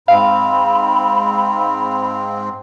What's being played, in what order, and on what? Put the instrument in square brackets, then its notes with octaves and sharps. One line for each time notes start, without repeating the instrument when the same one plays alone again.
[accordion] G#2 C4 [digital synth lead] F5 [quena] B5